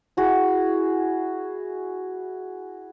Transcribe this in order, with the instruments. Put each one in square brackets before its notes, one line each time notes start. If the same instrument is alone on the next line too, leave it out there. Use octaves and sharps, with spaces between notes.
[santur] E4 F#4 G#4